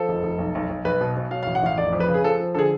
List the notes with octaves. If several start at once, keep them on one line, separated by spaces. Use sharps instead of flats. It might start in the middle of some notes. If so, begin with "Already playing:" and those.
Already playing: F3 A4
F1
F1
B1
B1
B1
B1 B4
B2
B2
F#3 F5
F5
A1
F#5
A1 F5
F1 D5
F2
B4
C#3
G#4
F3 A4
F3
D3 G#4 A4